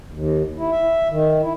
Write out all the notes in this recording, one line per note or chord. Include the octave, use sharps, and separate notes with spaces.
D#2
E4
E5
D#3
E4